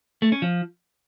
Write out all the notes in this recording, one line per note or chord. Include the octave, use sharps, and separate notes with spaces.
A3
C#4
F3